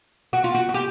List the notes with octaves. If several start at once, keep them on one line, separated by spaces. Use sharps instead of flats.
F#4
F4
F#4
F#4
G4